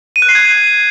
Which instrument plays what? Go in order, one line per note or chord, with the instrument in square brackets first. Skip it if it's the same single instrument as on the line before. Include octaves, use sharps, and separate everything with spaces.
[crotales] D#7
F#6
C7
G#6